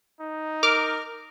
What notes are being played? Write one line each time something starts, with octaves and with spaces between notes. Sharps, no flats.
D#4
A#4 D6 F6